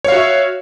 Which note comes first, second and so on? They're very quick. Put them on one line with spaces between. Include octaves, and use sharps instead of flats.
C#5 F5 F#4 E5